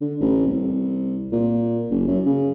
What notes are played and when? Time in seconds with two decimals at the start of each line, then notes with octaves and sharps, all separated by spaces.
0.01 D3
0.21 A1
0.47 C2
1.32 A#2
1.91 F#1
2.08 F#2
2.26 C#3